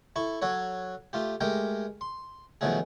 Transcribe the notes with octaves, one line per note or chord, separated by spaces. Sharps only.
E4 A4 C#6
F#3 F#4 A4 C#5
A3 F4 G4
G#3 A3 G4 A#4 G5
C6
B2 D#3 F3 F#3 A3 G#4